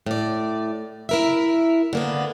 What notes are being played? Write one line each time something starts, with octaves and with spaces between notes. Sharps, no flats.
A2 D5
E4 A#4 E5
D3 A#3 B3